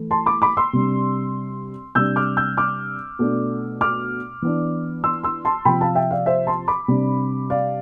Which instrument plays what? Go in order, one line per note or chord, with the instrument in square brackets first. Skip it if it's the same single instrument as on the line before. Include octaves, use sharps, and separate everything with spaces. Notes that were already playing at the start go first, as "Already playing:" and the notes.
Already playing: [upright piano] E3 A3
A5 C6
B5 D6
B5 D6
C6 E6
C3 G3 D4
C3 G3 D4 E6 G6
D6 F6
E6 G6
D6 F6
B2 A3 D4
D6 F6
E3 B3 D4
C6 E6
C6 E6
A5 C6
C3 F3 C4 G5 B5
F5 A5
E5 G5
D5 F5
C5 E5
A5 C6
B5 D6
C3 G3 D4
D5 F5